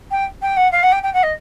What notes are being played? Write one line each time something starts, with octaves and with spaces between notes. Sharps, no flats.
G5
G5
F#5
F5
F#5
G5
G5
F#5
D#5